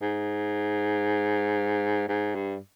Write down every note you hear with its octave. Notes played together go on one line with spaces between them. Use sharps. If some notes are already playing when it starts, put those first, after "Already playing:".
G#2
G#2
G2